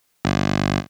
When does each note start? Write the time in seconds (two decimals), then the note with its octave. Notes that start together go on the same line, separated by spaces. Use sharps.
0.25 G1